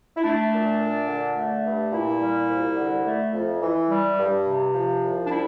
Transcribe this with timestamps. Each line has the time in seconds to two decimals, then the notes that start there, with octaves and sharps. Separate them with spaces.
0.16 E4
0.24 A3 D4
0.52 A#2
0.79 A#2
1.08 D3
1.36 A3
1.64 G2
1.92 A#2 E4
2.20 G3
2.49 C2
2.77 D3
3.05 A3
3.33 F2
3.61 E3
3.89 G3
4.18 G2
4.46 C3
4.74 F3
5.02 C2
5.25 D4
5.30 G3 E4